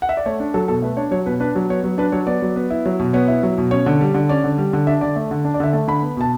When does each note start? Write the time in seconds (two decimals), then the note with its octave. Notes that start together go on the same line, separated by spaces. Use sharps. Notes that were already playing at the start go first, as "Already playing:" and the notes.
0.02 F#5
0.09 E5
0.17 D5
0.26 A3 C#5
0.40 D4
0.54 F#3 A4
0.68 B2 A4
0.82 A3 B4
0.97 D4 C#5
1.11 F#3 C#5
1.26 B2 B4
1.40 D4 B4
1.56 F#3
1.69 B3 C#5
1.84 F#3
1.98 D4 B4
2.12 F#3 C#5
2.27 B3 D5
2.42 F#3
2.56 B3
2.70 E4
2.86 F#3
2.99 B2
3.13 B3 C#5
3.28 E4
3.43 F#3
3.58 B2
3.71 C#4 C#5
3.86 D3
4.01 G3
4.14 D3
4.29 C#4 D5
4.44 D3
4.58 G3
4.73 D3
4.87 D4 E5
5.01 D3 D5
5.16 A3
5.31 D3
5.45 D4
5.54 D5
5.60 D3 E5
5.73 A3 A5
5.88 D3 B5
6.03 B3
6.17 B2 A5